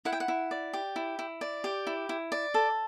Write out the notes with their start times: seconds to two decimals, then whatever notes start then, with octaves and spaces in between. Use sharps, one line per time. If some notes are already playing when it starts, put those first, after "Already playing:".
0.05 E4 F#5
0.12 G5
0.20 F#5
0.28 E4
0.51 D5
0.73 G4
0.96 E4
1.19 E4
1.41 D5
1.64 G4
1.87 E4
2.09 E4
2.32 D5
2.54 A4